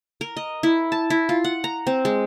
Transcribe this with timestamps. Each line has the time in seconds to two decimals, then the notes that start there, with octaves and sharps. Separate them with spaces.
0.21 A#4
0.37 D#5
0.63 E4
0.92 A5
1.10 E4
1.29 F4
1.44 F#5
1.64 A#5
1.87 C4
2.05 G#3